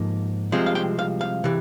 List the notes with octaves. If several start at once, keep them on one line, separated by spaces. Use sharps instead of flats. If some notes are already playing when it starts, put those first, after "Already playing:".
Already playing: G#2 F3 A#3
C2 C3 F3 G#3 C4
F5
G5
F5
F5
C3 E3